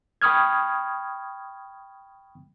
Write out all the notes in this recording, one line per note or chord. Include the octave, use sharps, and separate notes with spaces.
G5 B5 C#6 D#6 F6 G#6